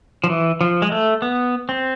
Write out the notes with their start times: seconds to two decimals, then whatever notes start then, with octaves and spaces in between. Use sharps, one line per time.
0.24 F3
0.30 E3
0.61 F3
0.82 G#3
0.92 A3
1.22 B3
1.69 C4